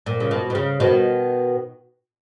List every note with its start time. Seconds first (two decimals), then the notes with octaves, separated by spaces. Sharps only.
0.06 A#2
0.20 C#3
0.31 B2
0.50 B2
0.55 C#3
0.80 B2 D#3